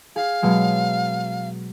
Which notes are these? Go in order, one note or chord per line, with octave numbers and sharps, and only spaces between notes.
G#4 F5 C7
B2 F#3 G#3